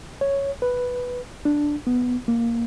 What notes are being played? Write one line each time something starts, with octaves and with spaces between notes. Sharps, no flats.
C#5
B4
D4
B3
A#3